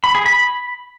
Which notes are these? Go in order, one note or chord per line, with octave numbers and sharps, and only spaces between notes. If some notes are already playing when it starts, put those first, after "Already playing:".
B5
G#4
B5